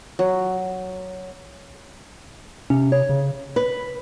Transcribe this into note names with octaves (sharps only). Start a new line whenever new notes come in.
F#3
C3 C#4
C#5
C#3
B4